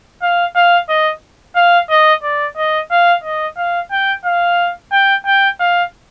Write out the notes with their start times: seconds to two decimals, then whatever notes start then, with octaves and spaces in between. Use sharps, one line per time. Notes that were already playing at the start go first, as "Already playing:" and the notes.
0.22 F5
0.55 F5
0.89 D#5
1.56 F5
1.90 D#5
2.23 D5
2.57 D#5
2.91 F5
3.24 D#5
3.57 F5
3.91 G5
4.25 F5
4.92 G5
5.26 G5
5.60 F5